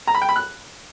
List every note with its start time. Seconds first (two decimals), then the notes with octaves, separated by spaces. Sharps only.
0.07 A#5
0.15 B5
0.22 G5
0.29 B5
0.36 F#6